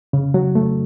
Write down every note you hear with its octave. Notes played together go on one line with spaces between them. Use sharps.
C#3
F#3
A3